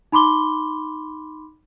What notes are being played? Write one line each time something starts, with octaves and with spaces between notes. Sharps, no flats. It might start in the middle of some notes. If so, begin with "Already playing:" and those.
D#4 B5 C6 D6 G7